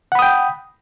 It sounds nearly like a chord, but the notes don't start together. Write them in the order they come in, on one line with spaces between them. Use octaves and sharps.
F#5 B5 D#6 G5